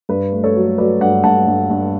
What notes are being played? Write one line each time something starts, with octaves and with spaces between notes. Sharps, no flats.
G2 B4
A3
A4 C#5
F#3
F#3 B4 D5
G2 D5 F#5
G2 F#5 A5
G2
G2